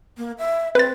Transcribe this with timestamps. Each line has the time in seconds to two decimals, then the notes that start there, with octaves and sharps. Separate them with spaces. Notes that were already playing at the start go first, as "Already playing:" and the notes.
0.18 A#3
0.38 E5
0.75 C4 B4 A6